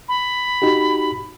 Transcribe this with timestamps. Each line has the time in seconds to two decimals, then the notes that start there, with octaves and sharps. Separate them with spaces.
0.08 B5
0.62 D#4 F#4 G4